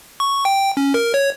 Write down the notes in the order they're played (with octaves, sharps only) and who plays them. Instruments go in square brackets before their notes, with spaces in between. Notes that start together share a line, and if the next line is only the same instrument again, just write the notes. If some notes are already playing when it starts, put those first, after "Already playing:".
[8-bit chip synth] C#6
G5
C#4
A#4
C#5